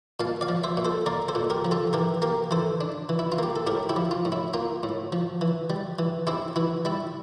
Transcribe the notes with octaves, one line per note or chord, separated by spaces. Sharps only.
A#2 F5 A5
D5 F5
F3
C5 E5
A#2
A4 C5
A#3 A#4 D5
A4 C5
A#2
G4 A#4
F3
F4 A4
E3 G4 A#4
A#3 G4 A#4
E3 A4 C5
D4
E3
E4
F4
A#3 G4
A4
A2 G4 A#4
E4 G4
F3
F4
A2
E4
A#3 F4
A2
F3
E3
G3
E3
C4 E4 G4
E3 E4
G3 E4